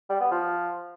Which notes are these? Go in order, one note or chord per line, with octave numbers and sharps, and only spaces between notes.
G3
B3
F3